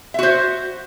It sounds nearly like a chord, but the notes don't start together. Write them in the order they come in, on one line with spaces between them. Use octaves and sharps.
E5 F#4 C5